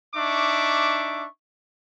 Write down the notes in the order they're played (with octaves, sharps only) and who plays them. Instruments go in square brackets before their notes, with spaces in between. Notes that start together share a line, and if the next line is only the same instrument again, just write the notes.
[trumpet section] D4 D#4 E5 C#6 D6